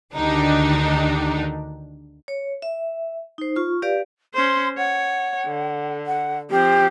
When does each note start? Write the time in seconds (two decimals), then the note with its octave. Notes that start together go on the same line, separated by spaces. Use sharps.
0.14 D2 D3 D#3 D4 D#4 G4
2.28 C#5
2.62 E5
3.38 D#4 C5
3.56 F4 C#6
3.82 G4 B4 D5 F5
4.34 C#4 C5 C6
4.78 C#5 F#5
5.47 D3
6.06 F#5
6.50 F3 C4 G4